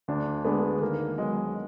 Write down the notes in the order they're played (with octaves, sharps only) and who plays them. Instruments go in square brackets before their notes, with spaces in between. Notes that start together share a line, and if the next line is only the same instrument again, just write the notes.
[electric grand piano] D2 [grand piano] D4
[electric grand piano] D3 G#3 D4 [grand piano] B3
[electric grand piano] D#3 [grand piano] A#3
[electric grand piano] F#3 B3 [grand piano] G#3